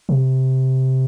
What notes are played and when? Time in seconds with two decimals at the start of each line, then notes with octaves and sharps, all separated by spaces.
0.09 C3